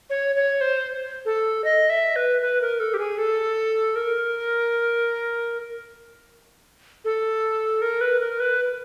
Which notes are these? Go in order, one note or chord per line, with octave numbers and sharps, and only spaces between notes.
C#5
C#5
C5
A4
D#5
E5
B4
B4
A#4
A4
G4
G#4
A4
A#4
A4
A#4
B4
A#4
B4